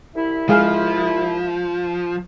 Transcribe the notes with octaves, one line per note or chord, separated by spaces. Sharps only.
C2 E4 E5
F3 G#3 G#4 F5